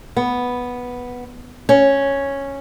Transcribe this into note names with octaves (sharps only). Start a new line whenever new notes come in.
B3
C#4